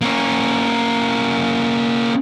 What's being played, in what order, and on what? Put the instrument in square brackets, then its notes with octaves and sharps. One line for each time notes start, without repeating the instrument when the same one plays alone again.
[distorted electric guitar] A#3 C#4